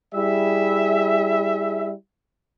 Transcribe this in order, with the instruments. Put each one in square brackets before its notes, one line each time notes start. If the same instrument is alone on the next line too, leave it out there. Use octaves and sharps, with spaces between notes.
[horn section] G3 E4 G#4 E5